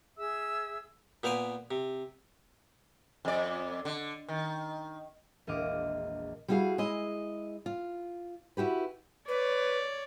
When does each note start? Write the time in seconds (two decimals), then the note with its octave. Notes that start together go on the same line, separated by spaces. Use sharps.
0.18 G#4 E5 E6
1.23 A#2 B3 C5 F5 G5 G#5
1.71 C3
3.25 F2 D5
3.85 D3
4.28 D#3
5.47 E1 A#1 D#5 F5 D6
6.48 G3 E4 F#4 G#4 F5
6.78 G#3 E4 D#5
7.66 F4
8.57 E4 F#4 G4 B4
9.28 B4 C#5 D5